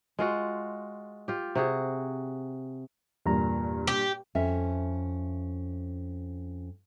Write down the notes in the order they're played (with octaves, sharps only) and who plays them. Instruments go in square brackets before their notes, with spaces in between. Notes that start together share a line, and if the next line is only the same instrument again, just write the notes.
[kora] G#3 F4 F#4
F4 G4
C3 F#4 G#4
[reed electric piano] E2 A#5 [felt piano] G2 A#2
[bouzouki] G4
[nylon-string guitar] F2 C#4 E5